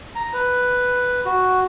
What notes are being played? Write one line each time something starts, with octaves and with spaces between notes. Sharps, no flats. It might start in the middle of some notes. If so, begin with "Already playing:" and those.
A#5
B4
F#4